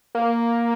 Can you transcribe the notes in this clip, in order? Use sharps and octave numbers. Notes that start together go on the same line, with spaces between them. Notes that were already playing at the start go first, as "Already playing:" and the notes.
A#3